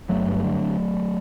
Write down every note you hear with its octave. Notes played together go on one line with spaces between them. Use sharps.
G1 F#3 A3
G2
D3